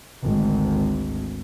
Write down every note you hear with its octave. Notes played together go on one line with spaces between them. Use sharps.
G#1 D2